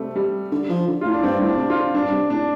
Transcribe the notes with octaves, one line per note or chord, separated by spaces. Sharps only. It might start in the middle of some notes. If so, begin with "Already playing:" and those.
Already playing: C3 G3 A3
G3
D3
F3
D3
A2 F4
D4
G2 C4
A2
D4
C3
F4
D3
G2 D4
C3
A2 D4